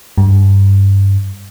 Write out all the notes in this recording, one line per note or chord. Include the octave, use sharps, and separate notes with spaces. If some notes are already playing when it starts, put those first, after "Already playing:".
G2